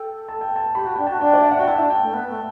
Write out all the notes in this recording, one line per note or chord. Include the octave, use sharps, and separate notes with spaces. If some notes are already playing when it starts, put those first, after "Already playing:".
Already playing: A4 G5
A5
G5
A5
G4 B5
F#4 A5
D4 G5
F#4 A5
D4 G5
D5
E5
F#5
F#4 G5
E4 A5
D4
G5
A3
B3
A3